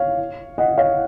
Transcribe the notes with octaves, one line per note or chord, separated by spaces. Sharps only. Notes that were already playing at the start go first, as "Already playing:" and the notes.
Already playing: C#5 F5
D#5 F#5
C#5 F5